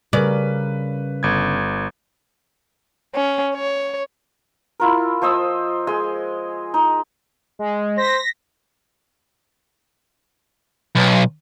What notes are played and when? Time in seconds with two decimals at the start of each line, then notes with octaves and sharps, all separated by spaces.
0.13 C#3 G3 A#4 B4 D5
1.23 G1 G#6
3.15 C#4
3.55 C#5
4.80 E4 F4 A#4
5.22 F3 C5 D#5 E6
5.87 G#3 G#5 C6
6.74 D#4
7.59 G#3
7.98 C5 A#6 B6
10.96 B1